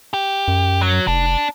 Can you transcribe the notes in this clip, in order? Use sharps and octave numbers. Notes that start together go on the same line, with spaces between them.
G4
F#2
F#3
F1 D4